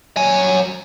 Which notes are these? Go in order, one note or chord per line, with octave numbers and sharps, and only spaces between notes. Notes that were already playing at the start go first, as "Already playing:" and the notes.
F#3 G#5